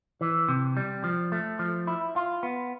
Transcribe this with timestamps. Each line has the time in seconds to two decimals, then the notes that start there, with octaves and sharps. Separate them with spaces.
0.21 E3
0.48 C3
0.77 G3
1.04 F3
1.32 A3
1.59 F3
1.87 E4
2.16 F4
2.43 B3